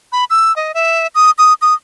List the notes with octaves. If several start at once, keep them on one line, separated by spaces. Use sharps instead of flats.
B5
E6
D#5
E5
D#6
D#6
D#6